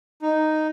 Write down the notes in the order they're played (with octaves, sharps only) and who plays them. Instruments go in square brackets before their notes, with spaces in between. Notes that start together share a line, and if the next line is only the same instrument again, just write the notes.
[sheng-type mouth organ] D#4